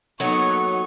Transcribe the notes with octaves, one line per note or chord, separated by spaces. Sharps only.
F#3 A#3 B3 D#4 A4 C#5 F#5 C#6